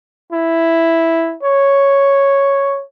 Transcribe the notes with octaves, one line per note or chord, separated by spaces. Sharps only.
E4
C#5